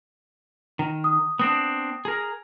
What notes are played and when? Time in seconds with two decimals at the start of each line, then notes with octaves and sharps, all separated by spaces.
0.79 D#3
1.04 D#6
1.39 B3 C4 D4 D#6
2.05 G#4 A#4